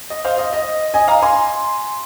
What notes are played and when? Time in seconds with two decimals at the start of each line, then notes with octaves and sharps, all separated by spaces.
0.10 D#5
0.25 C5 F5
0.38 D#5
0.53 D#5
0.94 D#5 G#5
1.08 F5 A#5
1.22 G#5 C6